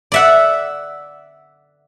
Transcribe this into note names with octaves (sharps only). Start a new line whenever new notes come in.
D5 E5 F#5